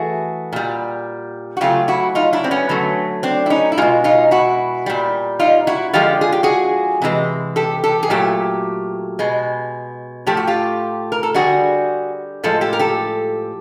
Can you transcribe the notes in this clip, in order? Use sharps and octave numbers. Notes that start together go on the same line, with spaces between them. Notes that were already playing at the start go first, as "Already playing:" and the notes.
Already playing: E3 A3 F#4 G#4
A#2 G3
F#4
C#3 F#3 A3 F4 G4
E4 F#4
D#4 F4
D4 E4
C4
B3 C#4
D3 F#3 A3
C4 D4
E4
C#4 D#4
E4
B2 G#3 D#4 F4
D#4 F4
E4 F#4
A#2 G3
D#4 F4
E4 F#4
D3 F3 G#3 F4 G4
G#4
G4
F#4 G#4
C3 E3 G#3
G4 A4
G4 A4
G#4
A#2 F#3 A3 G4
B2 G#3
A2 F3 A3 G4
F#4
F4 G4
A#4
A4
D3 G3 F#4 G#4
A2 F3 G#3 A4
G4 A4
A#4
G4 A4